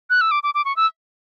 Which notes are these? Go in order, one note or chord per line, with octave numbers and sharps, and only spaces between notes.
F#6
E6
D6
D6
D6
C#6
E6